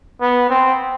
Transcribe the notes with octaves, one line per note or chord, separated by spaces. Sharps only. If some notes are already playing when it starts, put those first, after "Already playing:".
B3
C4